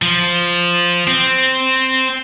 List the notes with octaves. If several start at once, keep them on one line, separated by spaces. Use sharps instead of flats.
F3
C4